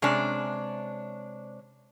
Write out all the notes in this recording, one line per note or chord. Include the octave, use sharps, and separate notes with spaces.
C3 G#3 C#4 D4